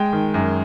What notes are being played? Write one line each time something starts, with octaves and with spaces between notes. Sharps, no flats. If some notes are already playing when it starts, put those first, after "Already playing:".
Already playing: G#3 G5
D#3
F#2